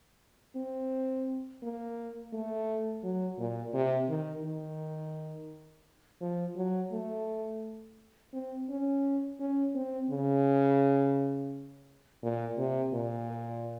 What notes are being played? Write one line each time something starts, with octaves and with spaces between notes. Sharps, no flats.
C4
A#3
A3
F#3
A#2
C3
D#3
D#3
F3
F#3
A3
C4
C#4
C#4
C4
C#3
A#2
C3
A#2